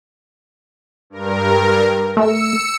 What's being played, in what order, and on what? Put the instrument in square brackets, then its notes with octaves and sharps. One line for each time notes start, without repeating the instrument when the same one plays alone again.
[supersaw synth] G2 A#4
[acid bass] A3 [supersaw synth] E6 C#7